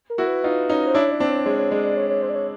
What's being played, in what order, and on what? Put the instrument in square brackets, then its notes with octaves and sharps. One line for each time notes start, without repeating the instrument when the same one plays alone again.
[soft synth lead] A#4
[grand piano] E4 F#4
[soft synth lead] B4
[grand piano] D#4 F4
C#4 D#4
[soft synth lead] C5
[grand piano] D4 E4 [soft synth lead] C#5
[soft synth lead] D5
[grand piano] C4 D4
[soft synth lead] C#5
[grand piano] G#3 [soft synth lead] C#5
[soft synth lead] C#5
[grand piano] G#3 [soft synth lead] D5
[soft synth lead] D5
C#5
C#5
C5
D5
C#5